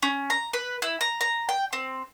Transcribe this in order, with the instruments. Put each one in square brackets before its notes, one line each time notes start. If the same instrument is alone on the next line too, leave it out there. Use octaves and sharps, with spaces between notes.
[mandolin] C#4
A#5
B4
E4
A#5
A#5
G5
C4